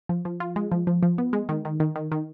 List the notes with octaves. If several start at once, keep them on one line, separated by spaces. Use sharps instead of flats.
F3
F3
F4
G#3
F3
F3
F3
B3
G#3
D#3
D#3
D#3
D#3
D#3